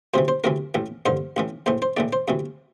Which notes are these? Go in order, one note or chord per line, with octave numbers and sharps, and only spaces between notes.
D2 C3 E3 C5
C5
D2 C3 E3 A#4
A1 A2 E3
A1 G2 D3 C5
A1 A2 E3
A#1 A2 E3 C5
C5
A#1 A2 E3 D5
C5
D2 C3 E3